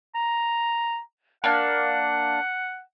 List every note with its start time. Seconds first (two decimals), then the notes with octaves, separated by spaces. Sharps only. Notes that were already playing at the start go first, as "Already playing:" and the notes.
0.15 A#5
1.44 A#3 D4 F#5